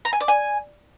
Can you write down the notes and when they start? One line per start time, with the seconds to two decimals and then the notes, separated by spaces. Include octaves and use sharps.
0.05 A#5
0.13 G#5
0.21 D5
0.28 G#5